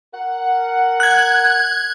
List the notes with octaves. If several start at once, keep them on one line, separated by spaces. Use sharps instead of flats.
A#4 F#5
F#6 G#6